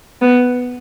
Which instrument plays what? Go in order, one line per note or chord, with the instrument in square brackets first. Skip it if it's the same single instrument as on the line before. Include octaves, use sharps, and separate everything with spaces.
[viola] B3